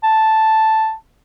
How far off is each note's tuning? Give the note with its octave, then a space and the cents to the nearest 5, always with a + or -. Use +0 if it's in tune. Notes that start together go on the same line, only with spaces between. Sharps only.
A5 +0